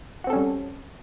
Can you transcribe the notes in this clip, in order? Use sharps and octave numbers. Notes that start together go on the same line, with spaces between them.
G3 C4 C#4 F#4 A4